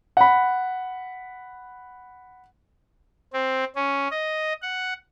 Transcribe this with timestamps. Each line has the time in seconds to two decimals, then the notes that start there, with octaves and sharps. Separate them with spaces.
0.17 F#5 B5
3.33 C4
3.75 C#4
4.11 D#5
4.62 F#5